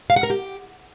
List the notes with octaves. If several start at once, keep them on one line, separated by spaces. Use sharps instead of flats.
F5
F#5
A#4
G4